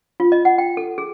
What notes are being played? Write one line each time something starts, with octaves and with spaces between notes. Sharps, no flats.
F4
D#5
F#5
G5
A4
G#4